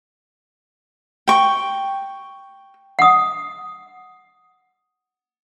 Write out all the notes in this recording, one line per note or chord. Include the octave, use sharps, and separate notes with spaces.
G5 C#6
F#5 D#6